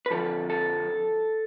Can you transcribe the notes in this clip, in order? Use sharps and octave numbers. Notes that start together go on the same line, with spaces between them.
B4
F2 D3 F3 A4
A4